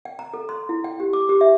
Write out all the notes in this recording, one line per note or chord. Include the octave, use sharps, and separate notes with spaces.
G5
A#5
A4
C6
E4
G5
G4
D6
G4
E5